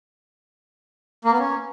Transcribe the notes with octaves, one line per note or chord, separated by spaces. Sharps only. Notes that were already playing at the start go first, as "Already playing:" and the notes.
A#3
B3
C#4